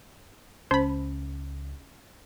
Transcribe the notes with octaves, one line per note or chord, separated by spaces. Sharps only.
C#2 C#4 C5 B5